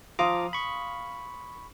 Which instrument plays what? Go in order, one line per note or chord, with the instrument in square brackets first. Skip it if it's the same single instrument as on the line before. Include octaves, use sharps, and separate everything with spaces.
[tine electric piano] F3 A#5 D6 [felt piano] F5 C6 D#6
[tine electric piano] B5 C#6